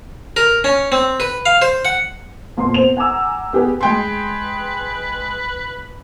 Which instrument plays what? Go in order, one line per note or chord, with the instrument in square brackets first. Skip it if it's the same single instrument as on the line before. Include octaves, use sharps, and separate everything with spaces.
[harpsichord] A#4
C#4
C4
B4
F5
C5
F#5
[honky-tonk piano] F2 A#2 B3 C6
B3 C4 C5 F7
F#5 G#5 A#5 D6 E6
B3 G4 G#4 B4
[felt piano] G#3 G5 C6 [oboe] B4